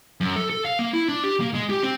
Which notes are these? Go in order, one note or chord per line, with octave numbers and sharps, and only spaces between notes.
F#2
A4
A4
F5
A#3
E4
D4
G4
A#3
G#3
G4
C4